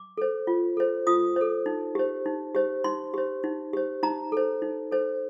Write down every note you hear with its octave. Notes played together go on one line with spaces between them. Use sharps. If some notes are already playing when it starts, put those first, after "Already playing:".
Already playing: D6
A4 C5
F4
A4 C5
F4 D#6
A4 C5
D#4
G4 C5
D#4
G4 C5
D#4 C6
G4 C5
D#4
G4 C5
D#4 A#5
A4 C5
D#4
A4 C5